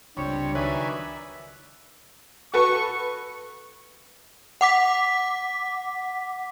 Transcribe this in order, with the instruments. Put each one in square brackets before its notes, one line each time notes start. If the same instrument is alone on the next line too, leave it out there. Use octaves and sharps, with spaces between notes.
[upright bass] C#2 [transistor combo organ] C3 G3 [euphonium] D4 [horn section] C#5
[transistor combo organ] D#3 D5 G#5 [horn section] F#3 B4 E5
[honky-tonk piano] F#4 A4 B4 [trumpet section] C#6
[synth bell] F#5 D6 B6